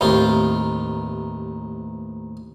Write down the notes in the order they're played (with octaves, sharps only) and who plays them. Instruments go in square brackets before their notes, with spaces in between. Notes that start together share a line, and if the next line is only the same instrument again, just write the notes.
[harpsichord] A1 D#2 C4 F4 C5